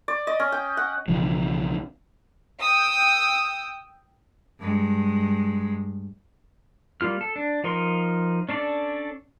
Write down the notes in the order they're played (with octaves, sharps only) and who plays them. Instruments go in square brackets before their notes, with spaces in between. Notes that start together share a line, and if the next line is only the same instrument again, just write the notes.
[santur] D5
D#5
C#4
G5
F#5
[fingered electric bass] B1 C#3 E3 F3
[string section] G5 D#6 E6
[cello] G2 G#3
[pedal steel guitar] G3 A#3 F4 F6
A4
D4
F3 D#4 A#4 C6
C#4 D4 A4 D5